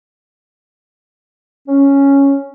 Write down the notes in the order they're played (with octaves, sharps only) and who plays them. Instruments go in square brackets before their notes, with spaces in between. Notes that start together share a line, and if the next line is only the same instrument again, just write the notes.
[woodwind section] C#4